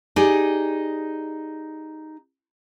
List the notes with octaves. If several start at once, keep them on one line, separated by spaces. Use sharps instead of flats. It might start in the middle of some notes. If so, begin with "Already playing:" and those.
D#4 G4 G#4 D5